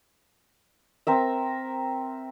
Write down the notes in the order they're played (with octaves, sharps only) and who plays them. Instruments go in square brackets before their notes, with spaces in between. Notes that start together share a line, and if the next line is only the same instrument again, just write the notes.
[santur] C4 A#4 E5